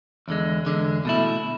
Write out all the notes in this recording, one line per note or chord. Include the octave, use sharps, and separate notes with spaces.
E2 D3 G#3
E2 D3 G#3
B2 A3 E4